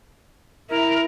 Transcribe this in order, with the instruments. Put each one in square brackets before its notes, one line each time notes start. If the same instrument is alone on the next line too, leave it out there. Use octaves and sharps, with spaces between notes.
[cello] E4 [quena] A#4